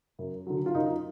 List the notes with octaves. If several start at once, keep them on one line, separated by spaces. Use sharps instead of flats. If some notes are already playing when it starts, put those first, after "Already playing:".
F#2
D3 F#3
F4
F#2 D#4